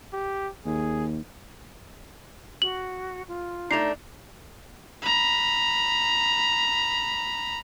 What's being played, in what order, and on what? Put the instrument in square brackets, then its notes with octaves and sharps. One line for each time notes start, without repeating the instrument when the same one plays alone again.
[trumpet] G4
[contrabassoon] D#2 [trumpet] G#4
[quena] F#4 [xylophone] F#7
[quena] F4
[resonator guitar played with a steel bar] A3 D4 [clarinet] D#4 [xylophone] C7 F7
[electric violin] A#5 B5